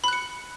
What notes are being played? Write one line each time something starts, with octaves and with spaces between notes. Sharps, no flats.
B5 F#6 C#7